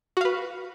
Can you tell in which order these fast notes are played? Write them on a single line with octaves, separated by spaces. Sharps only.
F#4 F5 B4